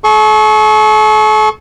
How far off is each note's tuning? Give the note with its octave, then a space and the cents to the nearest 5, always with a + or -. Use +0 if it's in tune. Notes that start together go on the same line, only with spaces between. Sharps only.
A4 -45 C#6 -10